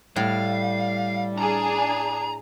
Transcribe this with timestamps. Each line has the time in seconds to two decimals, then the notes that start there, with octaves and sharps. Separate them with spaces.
0.16 A2 G3 F5
1.38 D4 G#4 A#5